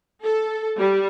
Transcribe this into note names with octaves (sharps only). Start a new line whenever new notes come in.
A4
G3